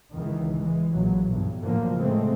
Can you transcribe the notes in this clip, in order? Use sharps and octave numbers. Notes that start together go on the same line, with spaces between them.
C#2 D#3 E3
E3 G#3
A#1 F#3
B1 G2 B2
A2 D3 F3 F#3 A#3
C#3 G#3 A3 C4